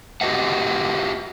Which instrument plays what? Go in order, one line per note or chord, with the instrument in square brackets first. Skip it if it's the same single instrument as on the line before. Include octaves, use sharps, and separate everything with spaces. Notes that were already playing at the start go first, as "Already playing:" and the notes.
[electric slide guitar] F#4 G4 B4 D#5 E5 F#5